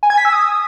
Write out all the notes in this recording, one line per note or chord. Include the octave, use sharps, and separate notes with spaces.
G#5
G#6
B6
E6
D#6